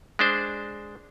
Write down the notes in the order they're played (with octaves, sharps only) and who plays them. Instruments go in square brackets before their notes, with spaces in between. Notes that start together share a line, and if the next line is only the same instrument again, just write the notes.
[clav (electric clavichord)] G#3 D4 C5